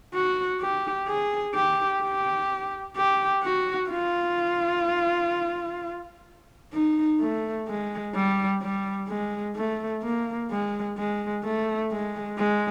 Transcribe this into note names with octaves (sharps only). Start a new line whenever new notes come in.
F#4
G4
G#4
G4
G4
G4
F#4
F4
D#4
A3
G#3
G3
G3
G#3
A3
A#3
G#3
G#3
A3
G#3
G#3